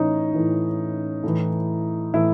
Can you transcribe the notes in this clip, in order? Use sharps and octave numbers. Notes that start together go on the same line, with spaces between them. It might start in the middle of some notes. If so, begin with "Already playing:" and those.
Already playing: A2 E3 C#4 D#4
A2 E3
A2 E3
A2 E3 E4